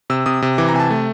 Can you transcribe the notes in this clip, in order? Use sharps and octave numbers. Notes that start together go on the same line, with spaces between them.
C3 E6
C3 D#6
C3
E3 D6
A#5
C3 G#5
A5
A3